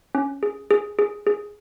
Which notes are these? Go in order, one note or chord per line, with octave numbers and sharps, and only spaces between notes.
C#4
G#4
G#4
G#4
G#4